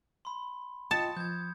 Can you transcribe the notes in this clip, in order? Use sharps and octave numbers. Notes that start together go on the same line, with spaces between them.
B5 C6
F4 D#5 G5 A5 D#6 C#7
F3 G6 G#6